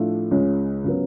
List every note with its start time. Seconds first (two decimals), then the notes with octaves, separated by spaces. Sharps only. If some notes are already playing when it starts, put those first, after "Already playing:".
Already playing: A2 F3 A3 D4 F4
0.31 C#2 C#3 G#3 C#4
0.84 C#3 F#3 B3